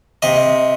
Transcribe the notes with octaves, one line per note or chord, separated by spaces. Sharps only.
C3 D#5